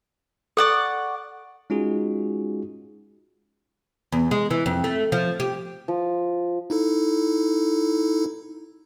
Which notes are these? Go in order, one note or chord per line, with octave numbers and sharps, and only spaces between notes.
A4 D5 F#5 C#6
G#3 C#4 D#4 F4 F#4 G#4
E2
G#3
E3
F2
A3
F3
G4
F3
D#4 E4 A4